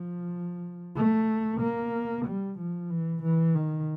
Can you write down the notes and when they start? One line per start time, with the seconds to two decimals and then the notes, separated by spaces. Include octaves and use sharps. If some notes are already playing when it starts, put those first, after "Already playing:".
Already playing: F3
0.96 A3
1.60 A#3
2.25 G3
2.58 F3
2.90 E3
3.22 E3
3.55 D#3